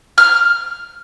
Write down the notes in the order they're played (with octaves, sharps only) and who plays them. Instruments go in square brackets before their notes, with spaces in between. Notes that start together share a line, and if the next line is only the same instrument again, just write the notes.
[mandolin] F6